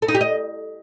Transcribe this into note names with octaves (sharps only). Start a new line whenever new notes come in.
A4
D#4
G4
D#5